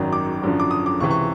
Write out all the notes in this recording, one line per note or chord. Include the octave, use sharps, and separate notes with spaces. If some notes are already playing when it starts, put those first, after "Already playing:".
Already playing: G#1 F#2 D#3 F#3
D6
G#1 F#2 D3 F3
D6
D#6
D6
C#2 C3 E3 C#6
C#6